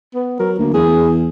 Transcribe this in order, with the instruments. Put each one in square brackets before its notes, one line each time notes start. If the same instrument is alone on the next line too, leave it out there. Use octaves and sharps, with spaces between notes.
[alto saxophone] B3
[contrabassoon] F#3 [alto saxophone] A#4
[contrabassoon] D2 [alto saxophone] A#3
[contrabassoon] E2 [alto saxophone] G#4